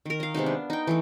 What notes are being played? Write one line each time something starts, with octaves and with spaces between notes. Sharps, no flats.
D#3 A#4
D#5 F5
C3 G#3 B3 D#4
D4
D#4 G5
E3 A3 D#4